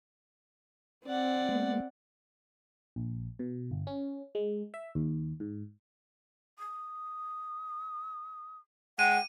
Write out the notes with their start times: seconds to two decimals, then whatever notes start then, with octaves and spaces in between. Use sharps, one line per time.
1.06 C4 D5 F#5
1.49 G#3 A#3 B3
2.96 A#1
3.39 B2
3.71 G1
3.87 C#4
4.35 G#3
4.74 E5
4.95 D#2
5.40 G#2
6.59 D#6
8.99 G#3 F#5 G5 D#7